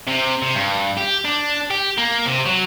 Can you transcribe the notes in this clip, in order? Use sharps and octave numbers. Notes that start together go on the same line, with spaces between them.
C3
C3
G2
G4
D4
G4
A#3
C3
F#3